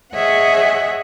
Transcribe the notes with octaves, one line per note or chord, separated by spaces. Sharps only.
G#4 C#5 D#5 E5 F#5